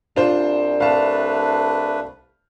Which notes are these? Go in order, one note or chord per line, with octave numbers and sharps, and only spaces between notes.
C2 D4 F4 C5
A3 D4 B4 F5 A5